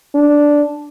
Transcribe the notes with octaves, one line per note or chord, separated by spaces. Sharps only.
D4